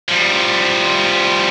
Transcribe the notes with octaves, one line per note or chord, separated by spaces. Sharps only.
F3 G3